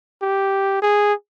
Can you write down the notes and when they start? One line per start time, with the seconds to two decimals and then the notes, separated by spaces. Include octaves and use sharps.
0.22 G4
0.82 G#4